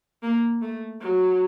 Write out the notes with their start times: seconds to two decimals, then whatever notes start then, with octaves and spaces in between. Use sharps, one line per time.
0.23 A#3
0.62 A3
1.01 F#3